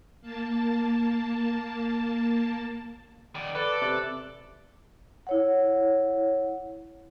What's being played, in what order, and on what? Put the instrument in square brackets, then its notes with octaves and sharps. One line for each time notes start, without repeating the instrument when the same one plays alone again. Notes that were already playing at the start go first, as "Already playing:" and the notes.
[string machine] A#3 A5
[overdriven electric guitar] D#3 D5
[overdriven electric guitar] A4 [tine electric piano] B4 [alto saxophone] D5
[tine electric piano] C3 D6 F#6
[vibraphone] E4 C#5 F#5